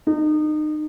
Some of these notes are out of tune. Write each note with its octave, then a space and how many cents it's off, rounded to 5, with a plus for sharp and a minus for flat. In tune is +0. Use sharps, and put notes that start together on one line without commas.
D#4 -30